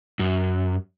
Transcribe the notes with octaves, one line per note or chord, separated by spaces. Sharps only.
F#2